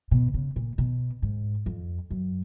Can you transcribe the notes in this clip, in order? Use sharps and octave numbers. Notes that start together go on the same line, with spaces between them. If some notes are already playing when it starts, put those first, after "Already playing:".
B2
C#3
A#2
B2
G#2
F2
F#2